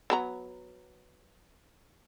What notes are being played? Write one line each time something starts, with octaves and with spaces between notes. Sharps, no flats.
F#3 B3 A#5